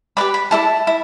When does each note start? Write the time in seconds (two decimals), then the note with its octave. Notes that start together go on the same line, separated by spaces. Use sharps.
0.17 G4 B4 D5 B5
0.34 B5
0.51 E4 A4 D5 A5
0.87 E4